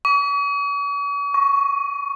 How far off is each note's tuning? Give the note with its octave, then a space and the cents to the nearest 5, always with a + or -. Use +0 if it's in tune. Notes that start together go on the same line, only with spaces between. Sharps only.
C#6 +45
C#6 +5